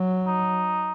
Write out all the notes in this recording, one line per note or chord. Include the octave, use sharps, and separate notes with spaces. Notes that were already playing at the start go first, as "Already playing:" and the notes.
Already playing: F#3
D#4